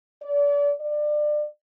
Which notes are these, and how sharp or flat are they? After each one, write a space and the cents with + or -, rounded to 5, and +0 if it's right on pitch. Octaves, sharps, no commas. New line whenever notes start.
D5 -35
D5 +25